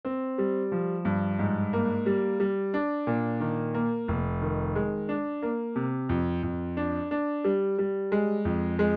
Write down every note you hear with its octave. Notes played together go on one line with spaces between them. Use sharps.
C4
G3
F3
G2
G#2
A#3
G3
G3
D4
A#2
D#3
A#3
F1
D#3
G#3
D4
A#3
C3
F2
F2
D4
D4
G3
G3
G#3
F2
G#3